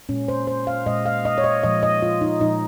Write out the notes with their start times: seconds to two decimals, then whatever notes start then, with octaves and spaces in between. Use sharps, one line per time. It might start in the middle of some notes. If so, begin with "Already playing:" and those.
0.09 A#2 G#3 C#4
0.28 C5
0.47 C5
0.67 F5
0.86 A#2 G#3 D#5
1.06 F5
1.25 D#5
1.38 C#5
1.44 D#5
1.64 A#2 F3 G#3 D#5
1.83 D#5
2.02 F4
2.21 D#4
2.40 A#2 F3 G#3 D#4